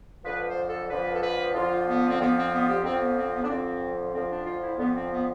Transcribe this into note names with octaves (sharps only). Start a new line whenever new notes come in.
F2 D3 F3 B4
C5
A4
F2 D3 F3 B4
A4
B4
F2 D3 F3 F4
B3
C4
F2 D3 F3 B3
C4
B3
G4
F2 D3 F3 C4
B3
C4
B3
D4
F2 D3 F3 C4
F2 D3 F3 C4
D4
F4
E4
F2 D3 F3 B3
C4
B3